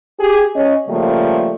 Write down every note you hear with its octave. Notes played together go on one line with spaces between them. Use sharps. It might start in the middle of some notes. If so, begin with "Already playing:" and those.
G4 G#4
C#4 D#5
C#3 F3 G3 A3 A#3